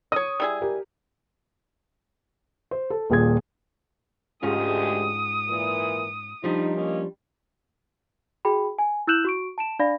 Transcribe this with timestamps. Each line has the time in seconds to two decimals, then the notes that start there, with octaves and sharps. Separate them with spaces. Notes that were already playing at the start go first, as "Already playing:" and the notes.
0.12 C#5 D#5 D#6
0.40 G3 E4 G#4
0.62 G4 A#4
2.71 C5
2.90 A4
3.10 D#1 A#2 G#4 G#6
4.43 D2 G#2 G#3 C#4 F4 G4 D#6
5.48 A#2 E3 A#4
6.44 F3 G3 D4 D#4
6.74 A#3 C#4 D#5
8.45 F#4 G#4 G5 B5
8.79 G#5
9.07 E4 E6 F#6 G6 E7 F#7
9.25 F#4 C#6 D7
9.58 A5 D7 E7
9.79 D4 D5 F5 B5 A#6